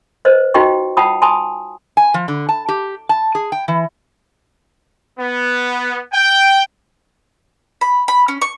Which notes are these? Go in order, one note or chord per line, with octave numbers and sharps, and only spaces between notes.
B4 C5 D#5
D#4 F4 F#4 D#5 G5 C#6
F4 F#5 G5 A5 B5 D#6
G#5 A5 B5 C6 D#6
G#5
F3
D3
A5
G4
A5
G#4
G5
E3
B3
G5
B5
B5
C#4
C#6